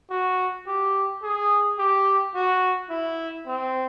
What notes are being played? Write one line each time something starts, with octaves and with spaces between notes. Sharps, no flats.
F#4
G4
G#4
G4
F#4
E4
C4